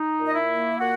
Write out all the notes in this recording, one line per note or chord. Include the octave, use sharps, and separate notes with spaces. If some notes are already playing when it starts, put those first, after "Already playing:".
Already playing: D#4
A#2
D#5
E4 E5
A#3
A#2 F#4 F#5